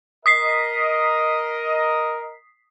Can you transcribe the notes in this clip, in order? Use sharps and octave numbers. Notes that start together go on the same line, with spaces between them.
A#4 D#5 D#6 B6 C7